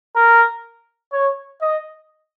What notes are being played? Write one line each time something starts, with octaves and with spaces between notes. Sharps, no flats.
A#4
C#5
D#5